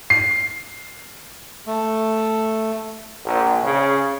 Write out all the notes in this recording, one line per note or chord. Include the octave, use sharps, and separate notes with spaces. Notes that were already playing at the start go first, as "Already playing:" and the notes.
C7
A3
A#1
C#3